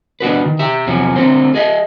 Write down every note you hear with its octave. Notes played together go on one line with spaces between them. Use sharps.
B3 D4 F#4 B4
D#3
G4 E5
E2 C3 F3 F#3 C#4
D3 A3 C4 C5
G#4 D#5 E5